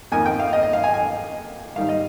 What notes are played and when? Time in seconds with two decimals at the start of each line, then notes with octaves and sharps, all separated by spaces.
0.12 F2 D#3 A#3 G#5
0.26 G5
0.39 F5
0.53 D#5
0.63 D#5
0.73 F5
0.84 G#5
0.94 G#5
1.76 G#2 D#3 G3 F5
1.89 D#5